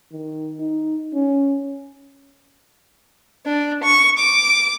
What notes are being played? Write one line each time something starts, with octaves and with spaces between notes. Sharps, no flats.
D#3
D#4
C#4
D4
C#6
D6